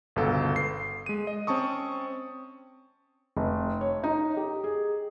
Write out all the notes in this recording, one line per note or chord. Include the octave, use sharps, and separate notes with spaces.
G1 C#2 B2 B3 A4 F5
C7
G#3 D#7
D#5
C4 C#4 A5 C#6 D#6
F1
C#5
D#4
G4
G#4